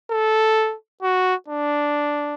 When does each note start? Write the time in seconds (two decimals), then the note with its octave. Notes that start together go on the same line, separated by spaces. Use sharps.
0.11 A4
1.03 F#4
1.48 D4